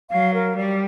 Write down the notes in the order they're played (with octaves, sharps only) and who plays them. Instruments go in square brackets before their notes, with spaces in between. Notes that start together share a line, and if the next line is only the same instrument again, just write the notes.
[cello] F#3 [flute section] F5
[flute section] A#4
[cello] G3 [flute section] D5